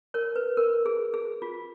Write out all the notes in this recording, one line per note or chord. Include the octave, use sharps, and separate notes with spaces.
A#4 C#5
B4
A#4
G#4
G#4
F4